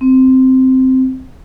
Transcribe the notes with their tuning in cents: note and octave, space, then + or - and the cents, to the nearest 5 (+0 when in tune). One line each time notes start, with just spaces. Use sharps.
C4 -5